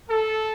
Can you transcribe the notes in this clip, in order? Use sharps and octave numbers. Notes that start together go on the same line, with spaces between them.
A4